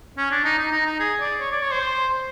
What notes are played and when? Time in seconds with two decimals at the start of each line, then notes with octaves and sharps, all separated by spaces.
0.17 C#4
0.31 D4
0.44 D#4
0.58 D#4
0.72 D#4
0.86 D#4
0.99 G#4
1.20 D5
1.40 C#5
1.52 D5
1.62 C#5
1.71 C5